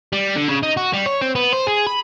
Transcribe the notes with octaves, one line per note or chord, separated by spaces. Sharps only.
G3
D3
C#3
D#4
F#4
G3
C#5
C4
B3
C5
G#4
B5